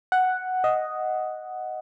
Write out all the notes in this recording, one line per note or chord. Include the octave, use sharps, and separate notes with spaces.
F#5
D#5